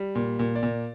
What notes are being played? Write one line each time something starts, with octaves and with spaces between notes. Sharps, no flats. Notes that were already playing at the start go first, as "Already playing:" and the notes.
Already playing: G3
A#2
A#2
D5
A#2